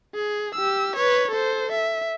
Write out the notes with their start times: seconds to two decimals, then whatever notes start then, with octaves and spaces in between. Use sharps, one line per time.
0.15 G#4
0.55 G4 E6
0.96 B4 C#5
1.31 A4 C5
1.72 E5